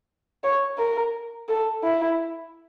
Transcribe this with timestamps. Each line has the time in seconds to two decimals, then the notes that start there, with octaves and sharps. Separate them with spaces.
0.44 C#5
0.78 A#4
1.49 A4
1.84 E4